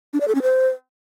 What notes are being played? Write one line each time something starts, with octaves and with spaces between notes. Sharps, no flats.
D4
D5
A4
C#4
C5